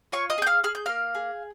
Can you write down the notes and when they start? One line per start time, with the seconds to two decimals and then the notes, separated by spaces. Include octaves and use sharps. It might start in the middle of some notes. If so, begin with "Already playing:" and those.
0.12 F4 C#5 C#6
0.30 D#5 D#6
0.38 G#4 G6
0.47 F5 F6
0.64 G#4 F6
0.75 G6
0.86 A#3 F5 F6
1.15 G#4